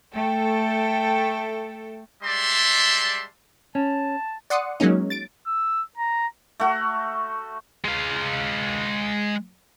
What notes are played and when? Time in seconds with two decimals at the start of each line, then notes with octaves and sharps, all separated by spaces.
0.14 A3 A4 G5
2.23 G3 G#3 D5 E5 A5 C6
3.75 C#4 A5
4.50 D5 F#5 C6 D#6 C#7
4.80 F#3 G#3 A#3 C#4 D#4
5.10 A6 D7
5.47 E6
5.97 A#5
6.60 A3 F#4
7.85 G#3 F5